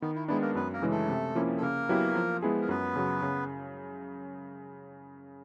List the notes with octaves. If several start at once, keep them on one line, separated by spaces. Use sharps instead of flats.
D#3 B3
E4
G#3 B3 D4 E4
A#3 A#4
F#2 B3 B4
A#3 A#4
C#3 E3 G#3 C#4
A3 A4
C3
F3 A#3 C#4 E4
A4
C#3 A#3 A#4
F#3 B3 E4 G4
F3
G#3 B3 E4 G#4
A#4
F#2 B3 B4
C#3 F#3
C#3